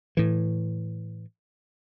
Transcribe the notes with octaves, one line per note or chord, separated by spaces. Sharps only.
A2 E3